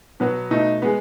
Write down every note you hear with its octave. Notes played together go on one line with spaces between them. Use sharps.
B2 F#3 B3
B2 A3 D#4
G#3 B3